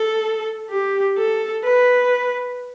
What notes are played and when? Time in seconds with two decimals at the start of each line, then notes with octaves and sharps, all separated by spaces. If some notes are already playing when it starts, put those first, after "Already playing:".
Already playing: A4
0.70 G4
1.18 A4
1.64 B4